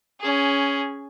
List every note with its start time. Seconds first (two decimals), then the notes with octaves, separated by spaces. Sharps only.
0.20 C#4 G#4